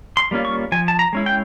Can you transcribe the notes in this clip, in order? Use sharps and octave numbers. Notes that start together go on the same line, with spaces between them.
C6
G3 A#3 C#4 F4
C#6
F3 G#5
A5
A#5
G#3 C#4 E4
G5